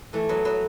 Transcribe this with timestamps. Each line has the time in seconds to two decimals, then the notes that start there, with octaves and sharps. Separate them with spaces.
0.13 E3 A3
0.29 F#3 B3
0.45 F#3 B3